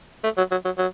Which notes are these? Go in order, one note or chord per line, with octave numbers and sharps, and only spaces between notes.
A3
F#3
F#3
F#3
F#3